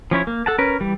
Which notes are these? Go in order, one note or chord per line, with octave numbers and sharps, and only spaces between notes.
F3 C#4 E4 C#5
A#3
A4 F#5 A5
C#4 A#4 B4
E3 G3